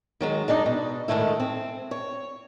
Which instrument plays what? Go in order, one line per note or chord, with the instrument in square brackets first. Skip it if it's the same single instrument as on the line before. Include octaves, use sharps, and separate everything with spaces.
[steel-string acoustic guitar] D#3 F#3 G#3
G#3 D4 D#4 D5
B2
A2 D#3 G#3 A3 E4
C4
C#5